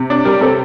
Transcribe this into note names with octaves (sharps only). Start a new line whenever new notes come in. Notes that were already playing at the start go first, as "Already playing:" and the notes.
Already playing: C3
D4
G3 A#4 D5
C3 A4 C5